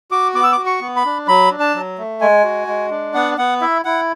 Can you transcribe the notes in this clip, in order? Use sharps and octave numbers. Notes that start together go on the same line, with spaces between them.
F#4 D6
B3 D6
E6
D6
F#4
C#6
B3
B5
D4
F#3 B5
D4
A5
F#3
A3
G#3 G#5
F#4
G#3
D4
B3 F#5
B3 F#5
E4 E5
E4 F#5